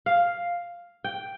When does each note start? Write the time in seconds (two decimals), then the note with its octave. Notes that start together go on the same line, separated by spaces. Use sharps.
0.06 F5
1.04 G5